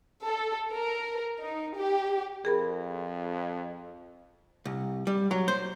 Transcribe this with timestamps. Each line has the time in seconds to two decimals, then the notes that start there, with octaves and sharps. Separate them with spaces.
0.25 A4
0.74 A#4
1.39 D#4
1.77 G4
2.45 F2 G#4 A#4 B5
4.65 C2
5.07 G3
5.31 F#3
5.48 C5